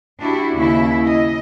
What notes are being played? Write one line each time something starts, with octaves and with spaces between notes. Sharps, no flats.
D4 E4 F#4 G4
D#2 C#3 E4 E5
D#5